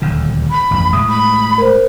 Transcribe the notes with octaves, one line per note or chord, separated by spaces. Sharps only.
D#1 D2 D3
B5
A1 F2
A2 G#3 D#6
B5
A#4 C5